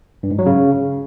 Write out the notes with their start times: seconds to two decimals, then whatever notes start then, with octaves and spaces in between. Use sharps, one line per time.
0.23 G2
0.31 G#2
0.39 F#3
0.46 C#3